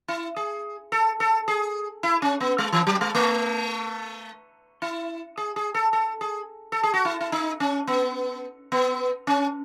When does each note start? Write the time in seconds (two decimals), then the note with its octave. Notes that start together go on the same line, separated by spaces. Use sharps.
0.08 E4
0.36 G#4
0.92 A4
1.20 A4
1.48 G#4
2.03 E4
2.22 C#4
2.40 B3
2.58 G#3
2.72 E3
2.87 F#3
3.01 G#3
3.15 A3
4.82 E4
5.37 G#4
5.56 G#4
5.74 A4
5.93 A4
6.21 G#4
6.72 A4
6.83 G#4
6.94 F#4
7.05 E4
7.21 E4
7.32 D#4
7.60 C#4
7.87 B3
8.72 B3
9.27 C#4